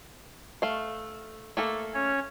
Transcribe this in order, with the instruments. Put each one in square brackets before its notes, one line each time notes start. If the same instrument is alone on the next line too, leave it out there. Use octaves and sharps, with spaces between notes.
[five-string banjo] A3 F5
A3 A#3 A4
[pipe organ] C#4 C#5